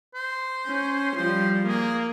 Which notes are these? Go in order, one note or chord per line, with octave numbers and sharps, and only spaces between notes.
C5
C#4
F3 G3 C5
A#3 G#4